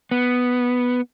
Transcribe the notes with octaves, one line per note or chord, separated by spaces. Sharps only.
B3